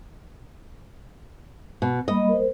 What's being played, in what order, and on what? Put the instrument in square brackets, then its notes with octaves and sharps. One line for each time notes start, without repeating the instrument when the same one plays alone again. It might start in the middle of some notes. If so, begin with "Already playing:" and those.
[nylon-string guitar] B2
[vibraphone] G3 A#3 B5 [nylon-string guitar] D#5
[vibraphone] A#4 C5